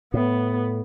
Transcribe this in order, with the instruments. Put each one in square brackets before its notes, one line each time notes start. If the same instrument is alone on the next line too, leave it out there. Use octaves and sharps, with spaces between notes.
[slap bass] A2 [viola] B3